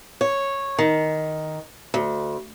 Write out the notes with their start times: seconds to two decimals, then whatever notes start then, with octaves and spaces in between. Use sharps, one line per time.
0.21 C#5
0.78 D#3
1.94 D2